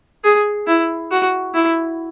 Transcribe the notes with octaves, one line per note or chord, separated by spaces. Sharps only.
G#4
E4
F#4
E4